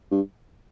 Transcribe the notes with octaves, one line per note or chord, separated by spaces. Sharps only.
G2